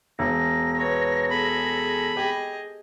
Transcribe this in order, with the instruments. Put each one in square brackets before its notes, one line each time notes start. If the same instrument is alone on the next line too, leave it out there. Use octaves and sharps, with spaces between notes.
[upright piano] E1 [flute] A#6
[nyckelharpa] B3 C#5
[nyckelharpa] G#4 A4 [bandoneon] B5
[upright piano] G4 [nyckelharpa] G#4 D#5